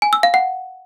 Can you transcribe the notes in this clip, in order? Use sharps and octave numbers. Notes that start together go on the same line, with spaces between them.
G#5
E6
F5
F#5